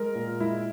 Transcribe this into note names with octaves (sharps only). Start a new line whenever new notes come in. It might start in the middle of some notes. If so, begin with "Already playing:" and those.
Already playing: G#3 A#4
A#2
G#3 E4